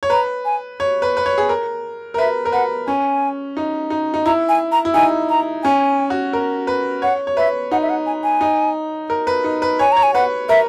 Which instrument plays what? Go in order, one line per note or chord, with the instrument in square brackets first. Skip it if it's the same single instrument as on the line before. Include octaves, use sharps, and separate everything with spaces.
[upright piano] C#5
[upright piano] B4 [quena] A#5
[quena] G#5
[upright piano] C#5
B4
B4
C#5
G#4
A#4
A#4
[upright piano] B4 [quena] E5
[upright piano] A#4
[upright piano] B4 [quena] F#5
[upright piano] C#4 [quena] G#5
[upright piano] D#4
D#4
D#4
[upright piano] E4 [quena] A#5
[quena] G#5
A#5
[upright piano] E4
[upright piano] D#4 [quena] G#5
[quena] A#5
[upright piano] C#4 [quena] G#5
[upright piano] F#4
A#4
B4
[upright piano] C#5 [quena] F#5
[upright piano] C#5
[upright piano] B4 [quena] E5
[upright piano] D#4 [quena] F#5
[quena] E5
F#5
G#5
G#5
[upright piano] D#4
A#4
B4
D#4
B4
[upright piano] C#5 [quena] G#5
[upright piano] C#5 [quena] A#5
[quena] G#5
[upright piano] B4 [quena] F#5
[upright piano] A#4 [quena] E5